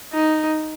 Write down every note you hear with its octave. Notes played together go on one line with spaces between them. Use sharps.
D#4